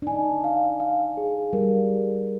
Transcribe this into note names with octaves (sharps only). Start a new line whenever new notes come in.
D4
D#4 G#5
F5
F5
G#4
G3 A#4